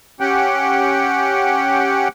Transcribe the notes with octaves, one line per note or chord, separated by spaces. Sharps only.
C#4 G4 F#5 G5